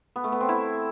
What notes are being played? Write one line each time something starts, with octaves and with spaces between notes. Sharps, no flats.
B3
A3
B3
C4
E4